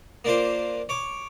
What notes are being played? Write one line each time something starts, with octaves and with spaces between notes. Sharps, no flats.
A#3 D4 F4 C5
C#5 D6